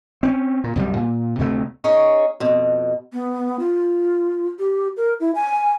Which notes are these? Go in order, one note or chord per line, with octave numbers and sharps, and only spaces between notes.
C4 C#4
A#2
C2 F#2 C3 G3
A#2
D2 C3 A3
C#4 D#4 G#4 C#5
F2 B2
B3
F4
G4
A#4
E4
G#5